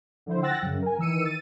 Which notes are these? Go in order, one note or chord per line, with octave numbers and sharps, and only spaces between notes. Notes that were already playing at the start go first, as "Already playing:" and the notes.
D3 F3 E4 C5
F#5 G5 E6 F#6 A6 A#6
F#2 C#3
A#4 G#5
D#3 E3 E6 C#7 D#7
A6 D#7